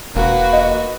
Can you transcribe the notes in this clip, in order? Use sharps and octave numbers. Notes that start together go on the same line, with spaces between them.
E1 A#3 F#4 B4
D#5